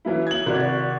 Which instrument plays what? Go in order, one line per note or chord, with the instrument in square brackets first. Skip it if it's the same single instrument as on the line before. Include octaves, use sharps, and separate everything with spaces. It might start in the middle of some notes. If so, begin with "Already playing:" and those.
[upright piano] E3 F#3 E4
G#6 F#7
[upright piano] G#1 [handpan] C3 F#4 D5